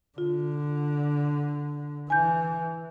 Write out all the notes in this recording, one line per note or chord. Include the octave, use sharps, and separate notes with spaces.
D3 F4
E3 G#5 G6